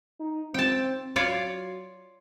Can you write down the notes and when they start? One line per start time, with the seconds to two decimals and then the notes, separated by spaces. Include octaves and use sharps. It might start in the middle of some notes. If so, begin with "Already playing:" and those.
0.20 D#4
0.54 C4 G5 A5
1.16 F#3 F4 C#5 D5